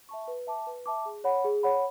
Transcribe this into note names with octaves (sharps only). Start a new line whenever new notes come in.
E5 A5 C#6
B4
E5 A5 D6
B4
E5 A5 D6
G#4
C#5 F#5 B5
G#4
C#5 F#5 B5